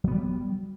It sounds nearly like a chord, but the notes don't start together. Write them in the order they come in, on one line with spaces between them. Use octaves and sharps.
F#3 B3 G3